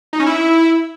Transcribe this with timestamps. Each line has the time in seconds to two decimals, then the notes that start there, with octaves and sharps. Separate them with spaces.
0.13 D#4
0.20 C#4
0.26 E4